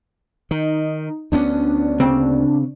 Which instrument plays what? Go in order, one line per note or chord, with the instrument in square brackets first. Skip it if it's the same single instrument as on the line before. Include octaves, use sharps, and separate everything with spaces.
[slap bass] D#3 [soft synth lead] D#4
[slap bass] D2 B3 C#4 [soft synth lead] D4
[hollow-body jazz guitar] C#3 C4